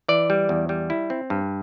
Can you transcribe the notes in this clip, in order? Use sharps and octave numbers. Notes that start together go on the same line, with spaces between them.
E3 D5
G3
E2
G3
E4
C4
G2